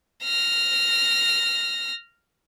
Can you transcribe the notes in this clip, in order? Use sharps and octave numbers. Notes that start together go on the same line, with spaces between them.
F6 A#6